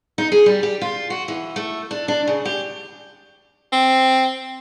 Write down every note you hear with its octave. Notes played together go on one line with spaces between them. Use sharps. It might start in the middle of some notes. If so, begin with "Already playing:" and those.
D#4
G#4
G3
G4
F4
F#4
E3
A3
D4
D4
C#3
G4
C4